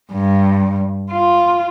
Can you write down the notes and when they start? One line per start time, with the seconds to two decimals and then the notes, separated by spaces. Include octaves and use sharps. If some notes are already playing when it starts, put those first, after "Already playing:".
0.12 G2
1.11 F4